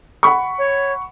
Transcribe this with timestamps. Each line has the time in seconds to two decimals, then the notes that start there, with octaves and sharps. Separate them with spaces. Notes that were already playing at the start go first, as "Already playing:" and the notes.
0.23 F#5 B5 C#6
0.59 C#5